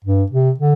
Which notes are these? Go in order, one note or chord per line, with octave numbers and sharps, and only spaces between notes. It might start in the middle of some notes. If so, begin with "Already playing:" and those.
G2
C3
D3